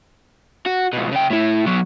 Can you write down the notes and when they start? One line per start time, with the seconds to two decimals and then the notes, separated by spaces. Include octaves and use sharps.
0.66 F#4
0.93 C#2 B2
1.12 C#3 G5
1.30 A2 E4
1.67 F#3 B3